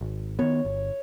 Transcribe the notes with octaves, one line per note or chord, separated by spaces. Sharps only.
G#1
D#3 B3 C#5
G1